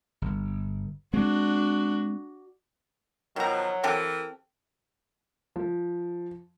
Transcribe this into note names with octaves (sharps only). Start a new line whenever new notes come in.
G1
G#3 C4 D4 F#4
B2 D#3 F3 F#3 A#5
E3 C4 G4 A4 A#4
F3